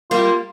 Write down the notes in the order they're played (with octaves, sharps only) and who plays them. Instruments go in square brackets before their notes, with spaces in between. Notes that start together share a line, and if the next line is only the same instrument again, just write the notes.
[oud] G3 A#3 [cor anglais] F4